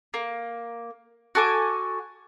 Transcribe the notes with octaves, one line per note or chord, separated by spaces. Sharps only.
A#3
F#4 A4 G#5 D6